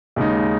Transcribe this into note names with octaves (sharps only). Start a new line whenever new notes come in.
D#2 C#3 G#3 D#4